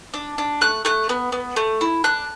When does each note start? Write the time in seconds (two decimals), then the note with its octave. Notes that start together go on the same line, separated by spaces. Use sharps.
0.14 D4
0.38 D4
0.61 A3 F#6
0.85 A3 F#6
1.09 B3
1.32 B3
1.56 A3
1.81 E4
2.04 D4 F#6